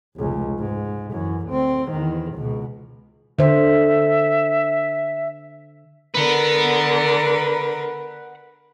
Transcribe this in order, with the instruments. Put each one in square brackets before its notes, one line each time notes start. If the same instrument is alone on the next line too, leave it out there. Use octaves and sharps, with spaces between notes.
[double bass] F1 C#2
G#2
F#2 E3
D2 C4
E2 D#3
C#2 B2
[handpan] D3 C5 [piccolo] E5
[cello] D3 A#4 [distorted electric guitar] B4 F#5